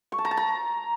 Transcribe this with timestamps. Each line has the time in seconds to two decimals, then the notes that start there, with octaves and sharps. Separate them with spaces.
0.12 C#6
0.18 A5
0.25 A#5
0.31 A5
0.37 A#5